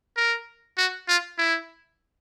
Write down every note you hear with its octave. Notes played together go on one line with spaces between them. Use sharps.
A#4
F#4
F4
E4